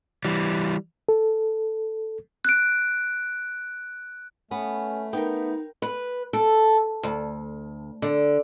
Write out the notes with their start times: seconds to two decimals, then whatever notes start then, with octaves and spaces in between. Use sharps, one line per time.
0.25 E3 G3
1.09 A4
2.45 F#6 D7
4.51 A3 B3 C#4
5.13 B3 D#4 A#4 G5
5.82 B4
6.33 A4
7.03 D2
8.02 D3